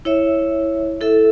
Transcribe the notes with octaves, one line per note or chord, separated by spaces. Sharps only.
E4 C#5 E5
E4 A4 E5